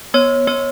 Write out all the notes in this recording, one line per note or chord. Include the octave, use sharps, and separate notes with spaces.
B3 C#5
B3 C#5